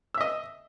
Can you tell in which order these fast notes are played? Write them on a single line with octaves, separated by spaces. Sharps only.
E6 E5 D#5